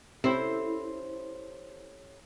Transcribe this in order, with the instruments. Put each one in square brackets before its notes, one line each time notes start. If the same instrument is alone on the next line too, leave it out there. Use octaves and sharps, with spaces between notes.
[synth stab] C3 [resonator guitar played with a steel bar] C4 C5 [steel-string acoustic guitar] C#4 G4 A4 [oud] E4